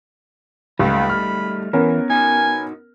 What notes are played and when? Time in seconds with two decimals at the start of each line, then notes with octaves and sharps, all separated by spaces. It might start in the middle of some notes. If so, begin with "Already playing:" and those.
0.79 C#2 G3 A3 D#4 B5
1.09 F6
1.73 E3 B3 C#4 A#4
2.10 D#4 F#4 G#5